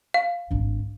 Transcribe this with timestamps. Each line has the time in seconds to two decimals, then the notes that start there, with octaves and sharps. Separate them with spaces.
0.14 F5
0.51 G#1 D4